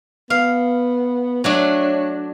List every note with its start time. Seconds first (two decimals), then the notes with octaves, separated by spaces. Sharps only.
0.30 B3 F5
1.44 F#3 A3 D4 C#5